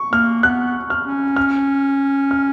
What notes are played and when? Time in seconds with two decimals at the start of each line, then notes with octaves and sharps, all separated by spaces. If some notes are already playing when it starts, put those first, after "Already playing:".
Already playing: C#6
0.12 A#3 F6
0.43 B3 F#6
0.90 F6
1.06 C#4
1.36 F6
2.31 F6